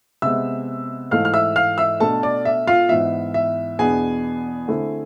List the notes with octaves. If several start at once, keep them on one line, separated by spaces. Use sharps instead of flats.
C3 G#3 B3 E5 E6
G#2 E3 A3 F5 F6
F6
E5 E6
F5 F6
E5 E6
B2 A3 D4 A4 A5
D5
E5
F4 F5
G#2 E3 B3 E4 E5
E5
E2 B2 B3 D4 G#4 G#5
D3 A3 C4 E4